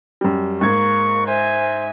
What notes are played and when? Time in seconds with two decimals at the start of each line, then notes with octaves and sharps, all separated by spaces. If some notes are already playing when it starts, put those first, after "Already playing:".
0.21 F#2 G3
0.61 G#2 A#3 C#6 G#6
1.27 C5 E5 G#5